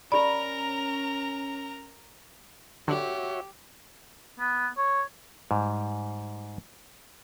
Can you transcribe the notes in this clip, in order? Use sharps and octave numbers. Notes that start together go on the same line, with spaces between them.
C#4 G4 A#4 D5 A#5 B5
D3 F#4 G4 C#5 E5
B3
C#5
G#2 G3